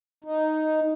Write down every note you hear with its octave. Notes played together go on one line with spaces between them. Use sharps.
D#4